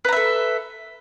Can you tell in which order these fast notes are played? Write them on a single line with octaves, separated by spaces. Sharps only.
B4 A#5 E5 A4